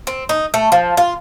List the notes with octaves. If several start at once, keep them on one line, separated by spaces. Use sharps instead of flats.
C4
D#4
A3
F3
F4